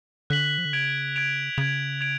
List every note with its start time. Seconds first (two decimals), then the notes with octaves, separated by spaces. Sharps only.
0.30 D3 F#6 B6 F#7
0.58 F3
0.65 D3
0.73 C#3 G#6 D7 F7
1.16 G#6 D7 F7
1.58 C#3 G#6 D7 F7
2.01 G#6 D7 F7